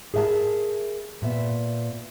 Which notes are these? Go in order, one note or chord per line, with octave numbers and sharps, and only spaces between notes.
G#4 A#4 E5 G#5 A5
A#2 B3 E5